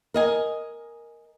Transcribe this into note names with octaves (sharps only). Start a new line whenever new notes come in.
A#4 D#5 G#5